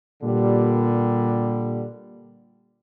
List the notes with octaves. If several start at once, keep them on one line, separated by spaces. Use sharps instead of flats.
A#2 D3 G3